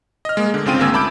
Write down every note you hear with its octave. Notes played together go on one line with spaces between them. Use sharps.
D#5 F6
G#3 A#3
D3
G1 C#3 C4 F4 G5 D#7
G#1 D2 A#3 G#5 E6 G#6
E5 A5 B5 D6 G6 D7